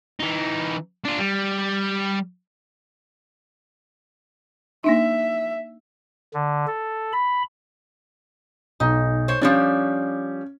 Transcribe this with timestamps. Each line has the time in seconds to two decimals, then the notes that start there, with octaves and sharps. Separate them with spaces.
0.19 E3 D#4
1.05 D4 F4
1.18 G3
4.84 A#3 D4 D#4 E5
6.34 D3
6.67 A4
7.13 B5
8.80 B1 D#4
9.28 C5 C#5
9.41 F3 G3 C#4 D4